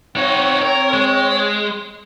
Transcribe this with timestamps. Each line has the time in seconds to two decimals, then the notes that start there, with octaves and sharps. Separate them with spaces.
0.16 C4 D#4 F#4 C#5
0.62 A#4
0.94 G#3